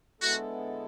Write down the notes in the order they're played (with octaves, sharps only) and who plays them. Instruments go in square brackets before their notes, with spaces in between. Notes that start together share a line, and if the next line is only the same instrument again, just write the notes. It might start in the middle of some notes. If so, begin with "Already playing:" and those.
[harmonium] D3 G#3 B3 E4 A4 [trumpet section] F#4